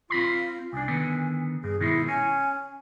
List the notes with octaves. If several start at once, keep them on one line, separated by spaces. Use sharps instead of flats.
C4 F4 B5 C6
C2 D4 G#5
D3 D#3 B3
G2 G#4
B2 D#3 G#3 E4
C#4 G#5